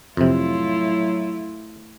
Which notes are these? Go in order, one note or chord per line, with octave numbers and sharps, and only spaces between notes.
F2 A2 C3 F#3 E4 F4